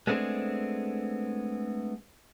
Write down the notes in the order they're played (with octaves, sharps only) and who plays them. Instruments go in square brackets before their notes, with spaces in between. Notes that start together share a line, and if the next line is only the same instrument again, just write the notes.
[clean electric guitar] G#3 A3 B3 C4 D4 G#4